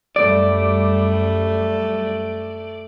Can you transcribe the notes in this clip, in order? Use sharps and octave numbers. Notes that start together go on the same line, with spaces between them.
F#2 G3 A3 D5